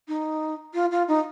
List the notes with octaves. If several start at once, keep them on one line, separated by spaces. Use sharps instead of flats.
D#4
F4
F4
D#4